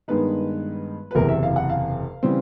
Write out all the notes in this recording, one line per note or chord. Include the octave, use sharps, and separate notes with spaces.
G2 D#3 G#3 B3 D#4 B4
B4
F#1 E2 C3 A#4
E5
F5
F#5
F5
C#3 E3 G3 C4